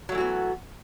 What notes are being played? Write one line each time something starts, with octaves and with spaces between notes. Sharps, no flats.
E3 F#3 A3 B3 F#4